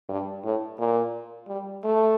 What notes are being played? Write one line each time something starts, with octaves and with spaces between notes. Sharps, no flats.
G2
A2
A#2
G3
A3